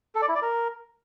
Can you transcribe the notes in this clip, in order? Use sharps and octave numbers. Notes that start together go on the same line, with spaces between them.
A4
D5
E4
D5
A#4